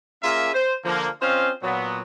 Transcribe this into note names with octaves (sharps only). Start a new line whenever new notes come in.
A#3 C#4 F4 G#4 A#4 E5
C5
D3 F3 A#3
C4 C#4 F4 C5 D#5 F5
A#2 F#3 B3